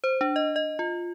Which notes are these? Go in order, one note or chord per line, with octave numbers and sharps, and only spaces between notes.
C5
D4
D#5
D#5
F4